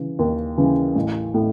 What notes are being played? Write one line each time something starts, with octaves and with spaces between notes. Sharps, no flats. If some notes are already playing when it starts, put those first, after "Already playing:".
Already playing: C#3 E3
D#2
C#3 E3
A1
A2